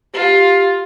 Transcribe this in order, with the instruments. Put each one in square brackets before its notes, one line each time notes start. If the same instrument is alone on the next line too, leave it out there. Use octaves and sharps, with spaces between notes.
[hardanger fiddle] F4 [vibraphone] G4